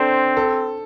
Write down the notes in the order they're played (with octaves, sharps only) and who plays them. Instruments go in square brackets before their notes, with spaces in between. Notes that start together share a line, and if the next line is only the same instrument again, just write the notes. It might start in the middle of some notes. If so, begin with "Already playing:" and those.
Already playing: [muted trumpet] C4 [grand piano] D4 A4 C5
[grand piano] A4